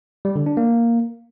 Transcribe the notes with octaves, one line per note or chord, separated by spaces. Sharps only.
G3
D3
D4
A#3